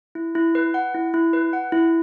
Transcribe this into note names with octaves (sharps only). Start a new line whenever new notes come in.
E4
E4
B4
F#5
E4
E4
B4
F#5
E4